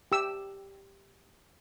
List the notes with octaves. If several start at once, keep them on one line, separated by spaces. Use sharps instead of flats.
G4 E6